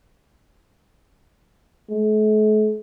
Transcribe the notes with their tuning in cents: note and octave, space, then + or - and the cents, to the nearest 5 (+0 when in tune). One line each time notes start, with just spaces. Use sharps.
A3 -45